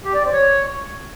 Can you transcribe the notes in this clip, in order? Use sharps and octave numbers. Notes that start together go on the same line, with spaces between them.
G4
D5
C4
C#5